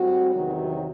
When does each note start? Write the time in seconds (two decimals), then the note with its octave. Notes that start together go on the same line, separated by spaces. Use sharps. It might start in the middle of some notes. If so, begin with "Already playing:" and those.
Already playing: A2 G3 C4 F#4
0.35 E2 C3 D#3 F#3